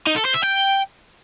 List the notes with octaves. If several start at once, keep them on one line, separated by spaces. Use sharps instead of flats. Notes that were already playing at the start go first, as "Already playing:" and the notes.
D#4
A4
C5
E5
G5